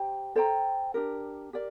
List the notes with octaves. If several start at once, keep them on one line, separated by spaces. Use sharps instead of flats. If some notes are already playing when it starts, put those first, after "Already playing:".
Already playing: G4 C5 G5 A#5
A4 C5 G5 A#5
D4 G4 A#4
G4 A#4 D5